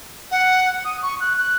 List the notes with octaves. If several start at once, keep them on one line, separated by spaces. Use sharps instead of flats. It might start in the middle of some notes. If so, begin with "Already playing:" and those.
F#5
D#6
C#6
F#6
F#6